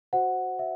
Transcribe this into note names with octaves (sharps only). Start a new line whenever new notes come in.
F#4 C5 F#5
E5